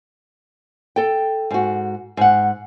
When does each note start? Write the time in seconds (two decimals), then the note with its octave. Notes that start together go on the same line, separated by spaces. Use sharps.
0.96 A4 G5
1.51 G#2 F#4
2.17 G#2 F#5